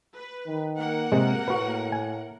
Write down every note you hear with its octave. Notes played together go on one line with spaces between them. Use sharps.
B4
D#3
A#3 A#4 F#5
C3 G#3
A2 F#4 B4
G#5